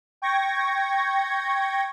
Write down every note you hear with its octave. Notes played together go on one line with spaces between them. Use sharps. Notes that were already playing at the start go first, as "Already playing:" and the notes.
G5 C#6 G#6 A#6